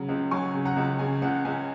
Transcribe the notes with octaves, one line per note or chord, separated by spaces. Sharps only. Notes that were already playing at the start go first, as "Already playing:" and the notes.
Already playing: C#3 F#3
C#2
F#3 G#5 C#6
C#3
F#5 A#5
C#2
C#3 G#5
C#2 F#5
C#2 G#5